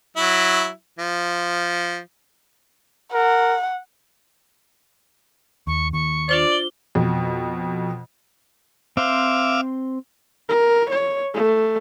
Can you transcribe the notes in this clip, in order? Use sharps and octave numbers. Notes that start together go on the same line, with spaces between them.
F#3 E4
F3
A#4 F#5
D#2 C#6
D#2 C#6
D4 F4 C5 D5
G7
F2 B2
C4 C5 E5 F5 C6 D6
A#4
C#5
A3